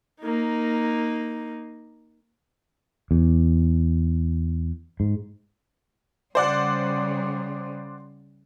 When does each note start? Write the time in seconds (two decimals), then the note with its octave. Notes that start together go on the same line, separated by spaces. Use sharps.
0.21 A#3 D#4
3.11 E2
5.00 G#2
6.35 C#3 G3 C5 D5 F#5